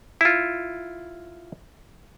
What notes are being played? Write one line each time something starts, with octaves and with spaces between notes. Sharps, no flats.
E4 F4